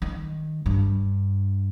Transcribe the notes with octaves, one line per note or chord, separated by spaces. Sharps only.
D#3
G2